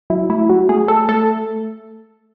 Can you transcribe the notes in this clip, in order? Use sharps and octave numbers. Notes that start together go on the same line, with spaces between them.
F#3 E4
A3 E4
F#3 F#4
A3 G#4
A3 A4
A3 A4